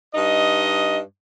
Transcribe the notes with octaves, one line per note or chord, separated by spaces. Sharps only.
G2 D#4 D#5